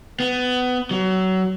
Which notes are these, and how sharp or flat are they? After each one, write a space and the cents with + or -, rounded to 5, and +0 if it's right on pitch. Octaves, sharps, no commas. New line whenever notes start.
B3 +20
F#3 +25